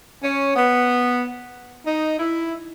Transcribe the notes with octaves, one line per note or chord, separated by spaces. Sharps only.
C#4
B3
D#4
E4